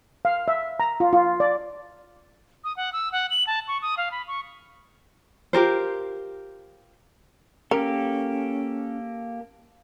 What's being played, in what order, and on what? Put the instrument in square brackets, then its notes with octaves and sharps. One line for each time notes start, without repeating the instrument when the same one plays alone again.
[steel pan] F5
E5
A#5
F4
F4
D5
[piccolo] D#6
F#5
E6
F#5
F#7
A5
C#6
D#6
F5
B5
C#6
[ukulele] F4 G4 A#4 C5
[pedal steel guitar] A#3 G4 A4 [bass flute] C#4 [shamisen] A#4